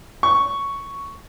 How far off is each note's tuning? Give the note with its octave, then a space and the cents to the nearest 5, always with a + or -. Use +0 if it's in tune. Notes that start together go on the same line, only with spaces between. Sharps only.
C#6 +5